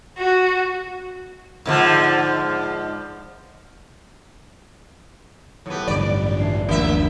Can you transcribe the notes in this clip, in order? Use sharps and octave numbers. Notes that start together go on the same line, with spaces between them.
F#4
G#2 D3 F3
A2 F#3 B3 G4
A1 G2 D3 D5
E3 D4 C7
F#1 D2 A#3 E5